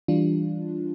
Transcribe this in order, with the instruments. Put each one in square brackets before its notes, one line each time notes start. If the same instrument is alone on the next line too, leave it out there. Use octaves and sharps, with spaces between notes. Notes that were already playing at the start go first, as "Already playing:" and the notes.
[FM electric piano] E3 G3 D4 F4